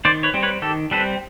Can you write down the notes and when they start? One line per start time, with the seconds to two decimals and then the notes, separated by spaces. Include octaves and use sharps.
0.05 D#3 C5 D5
0.23 B4 C#5
0.34 G3 C4
0.43 B4 C#5
0.62 D#3 G4 A4
0.91 G3 C4 A4 B4